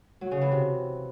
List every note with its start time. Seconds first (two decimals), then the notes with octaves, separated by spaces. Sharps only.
0.21 F#3
0.31 C#3
0.41 E3
0.52 C3